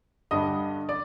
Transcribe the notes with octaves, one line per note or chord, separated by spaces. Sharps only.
G2 D3 G3 D#5 D#6
D5 D6